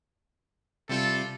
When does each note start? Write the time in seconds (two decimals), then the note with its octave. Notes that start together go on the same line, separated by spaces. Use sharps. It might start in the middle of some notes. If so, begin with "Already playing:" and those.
0.89 C3 G3 F4 A4